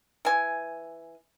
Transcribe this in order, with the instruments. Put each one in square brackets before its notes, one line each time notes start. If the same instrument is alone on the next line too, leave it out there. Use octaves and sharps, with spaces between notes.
[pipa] E3 G#5